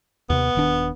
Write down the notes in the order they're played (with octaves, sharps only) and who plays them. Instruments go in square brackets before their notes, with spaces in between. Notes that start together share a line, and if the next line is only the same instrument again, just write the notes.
[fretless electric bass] D#2 C3 [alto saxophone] B3
[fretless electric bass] D#1 D#3 D4